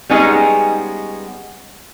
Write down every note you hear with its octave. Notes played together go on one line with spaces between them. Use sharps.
G3 G#3 B3 C#4 D#4 G#4